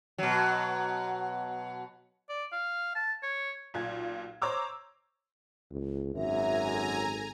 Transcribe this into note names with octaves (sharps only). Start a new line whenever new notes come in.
B2 F#3
D5
F5
A5
C#5
B1 A#2 G#6
C5 C#5 A#5 D6 E6
C#2
G#1 F#2 E5 G#5 A#5
A4